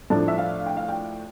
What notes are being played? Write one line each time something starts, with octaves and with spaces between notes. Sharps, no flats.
A2 F3 A3 D4 A5
E5
F5
G5
F5
G5